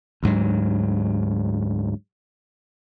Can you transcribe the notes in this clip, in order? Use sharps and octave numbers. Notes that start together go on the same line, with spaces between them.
D2 G#2 F#3